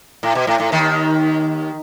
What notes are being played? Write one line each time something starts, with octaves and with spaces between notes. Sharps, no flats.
A2
B2
A2
A2
D#2 D#3